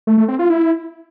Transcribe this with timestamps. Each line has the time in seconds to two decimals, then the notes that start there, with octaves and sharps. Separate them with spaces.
0.07 A3
0.18 A3
0.28 C4
0.39 F4
0.50 E4